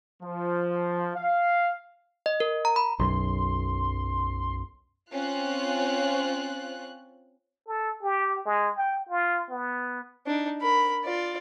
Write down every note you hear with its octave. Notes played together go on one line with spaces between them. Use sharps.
F3
F5
D#5
A#4
A#5
B5
B1 F#2 C6
C4 C#4 F4 C#5 F#6
A4
G4
G#3
G5
F4
B3
D4 D#4
A#4 B5
F4 D5